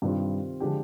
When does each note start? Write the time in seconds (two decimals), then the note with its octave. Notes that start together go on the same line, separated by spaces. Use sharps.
0.02 G2 C3 D#3 G3 C4 F4
0.60 D3 F3 G#3 D4 G4